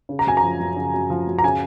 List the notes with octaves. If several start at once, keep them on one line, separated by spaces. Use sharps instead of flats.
C#3
A#5
F#2 G#5
A#5
F3
F#2
C#3
F#2
F3
F#2
A#5
C#3 G#5